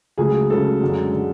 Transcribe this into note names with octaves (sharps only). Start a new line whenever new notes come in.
C#2 C#3 F#3 A3 G#4
C#2 C#3 F#3 A3 A4
F#2 D3 G#3
D3 G#3